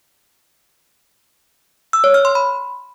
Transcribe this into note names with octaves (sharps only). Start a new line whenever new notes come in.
E6
C#5
F6
C6
B5